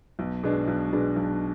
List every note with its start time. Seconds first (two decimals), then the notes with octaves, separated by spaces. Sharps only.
0.19 B1
0.43 B2 G#3 D4
0.68 B1
0.92 B2 G#3 D4
1.16 B1